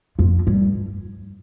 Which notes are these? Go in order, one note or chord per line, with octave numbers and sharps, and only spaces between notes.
F2
G2